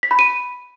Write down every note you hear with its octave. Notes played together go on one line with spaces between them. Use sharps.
B6
B5
D#7